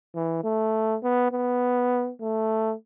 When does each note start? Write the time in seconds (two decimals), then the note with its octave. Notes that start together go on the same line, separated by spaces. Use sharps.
0.15 E3
0.44 A3
1.03 B3
1.32 B3
2.21 A3